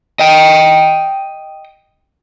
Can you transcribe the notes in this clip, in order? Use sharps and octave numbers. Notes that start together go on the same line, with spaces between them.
D#5 G5